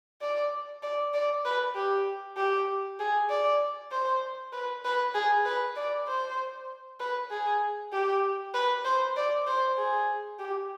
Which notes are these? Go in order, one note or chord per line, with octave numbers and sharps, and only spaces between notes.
D5
D5
D5
B4
G4
G4
G#4
D5
C5
B4
B4
G#4
B4
D5
C5
B4
G#4
G4
B4
C5
D5
C5
G#4
G4